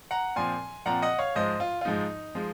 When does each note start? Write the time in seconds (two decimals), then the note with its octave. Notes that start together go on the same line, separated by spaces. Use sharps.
0.11 F#5 A#5
0.36 A#2 F3 C4 G#5 C6
0.86 A#2 F3 C4 F#5 A#5
1.02 D#5 F#5
1.18 C#5 F5
1.35 G#2 F3 G#3 C5 D#5
1.60 F4
1.81 F4
1.85 G#2 F3 G#3 D#4
2.35 F3 G#3